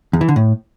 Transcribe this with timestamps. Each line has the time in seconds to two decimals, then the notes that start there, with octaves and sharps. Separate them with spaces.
0.13 E2
0.21 E3
0.28 D3
0.36 A2